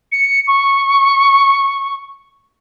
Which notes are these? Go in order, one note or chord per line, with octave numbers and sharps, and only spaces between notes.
C#7
C#6